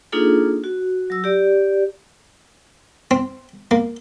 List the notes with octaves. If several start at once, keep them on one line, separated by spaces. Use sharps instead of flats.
A#3 D4 D#4 F4 G#4 A4
F#4
F#3 E6
G4 D5
C4
A#3